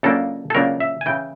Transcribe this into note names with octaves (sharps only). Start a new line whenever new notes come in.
C#2 C#3 F#3 A#3 D4 A4
A4
C#2 C#3 F#3 A#3 D4 A#4
E5
G#5
C#3 E3 G5